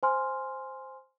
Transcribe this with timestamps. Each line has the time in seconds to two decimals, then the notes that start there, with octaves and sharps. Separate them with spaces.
0.03 C5 G#5 C6 F6